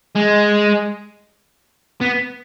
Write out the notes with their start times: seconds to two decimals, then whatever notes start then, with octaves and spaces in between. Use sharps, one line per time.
0.15 G#3
2.01 B3